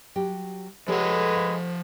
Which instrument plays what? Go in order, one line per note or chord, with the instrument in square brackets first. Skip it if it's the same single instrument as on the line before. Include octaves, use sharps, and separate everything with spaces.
[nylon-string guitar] F#3 G4
[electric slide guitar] F3 F#5 [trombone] G#3 [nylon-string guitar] G4 A4 C#5 [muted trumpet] B4
[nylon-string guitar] C5 F5